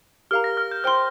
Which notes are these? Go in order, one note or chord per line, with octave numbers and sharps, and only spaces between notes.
G4 A#4 F5 A#5 F6
A#6
F6
G6
C5 G5 C6 F6